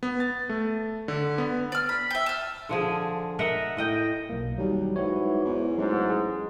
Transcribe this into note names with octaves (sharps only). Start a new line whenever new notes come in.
B3
A6
A3
D3
B3
D5 F6
B5
E5 G5
A5 F6
D3 F3 G#4
A#4 D#5 E5 F#5
A2 D#5 G5
B1 A#3
D#2 F#3 G3
G#2 E3 F#4 C#5
E2 G#2
A1 G#2 F#3
G#4